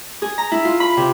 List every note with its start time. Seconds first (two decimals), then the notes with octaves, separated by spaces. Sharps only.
0.22 G#4
0.38 A#5
0.52 E4
0.65 F4
0.80 B5
0.97 C3